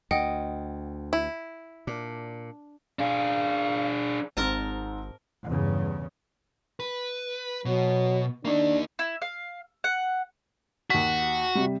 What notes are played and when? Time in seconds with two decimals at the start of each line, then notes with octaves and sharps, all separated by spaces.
0.11 D2 D#5 F#5 G5
1.13 E4
1.87 A#2 D4
2.99 D4 G#4 F5
4.37 G#1 G#2 C4 A#4 A5 A#5
5.48 E2 G2 C#3
6.80 B4
7.65 B2 F#3
8.45 A#3 D4 D#4
8.99 E4
9.22 F5
9.84 F#5
10.90 D#2 F#4 B6
11.55 C3 G3